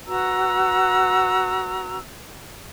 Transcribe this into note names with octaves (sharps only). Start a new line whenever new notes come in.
F#4 B4 A#5 E6